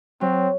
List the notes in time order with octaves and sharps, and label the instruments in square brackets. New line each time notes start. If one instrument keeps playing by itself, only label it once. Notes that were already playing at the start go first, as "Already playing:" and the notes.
[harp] F#3 [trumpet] C4